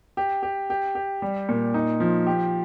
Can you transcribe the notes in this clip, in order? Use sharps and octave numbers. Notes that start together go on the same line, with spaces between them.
G4
G4
G4
G4
G3
A#2
D#4
F3
G4